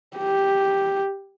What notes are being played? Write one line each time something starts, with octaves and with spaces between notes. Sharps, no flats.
G4